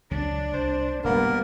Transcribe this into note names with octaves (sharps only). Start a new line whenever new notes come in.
C#2 F#3 D4
C2 C5
D1 C3 G3 G#3 A#3 B3 A#4